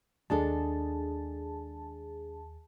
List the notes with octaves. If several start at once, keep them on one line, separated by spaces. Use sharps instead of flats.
D#2 G#3 D4 G#4 A4 A5